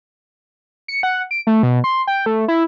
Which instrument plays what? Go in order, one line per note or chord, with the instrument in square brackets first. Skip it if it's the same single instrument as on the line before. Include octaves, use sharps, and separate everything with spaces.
[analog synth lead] C#7
F#5
D7
A3
B2
C6
G5
A3
E4